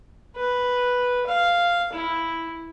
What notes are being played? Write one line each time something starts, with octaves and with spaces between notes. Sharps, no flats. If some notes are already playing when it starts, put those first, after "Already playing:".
B4
F5
E4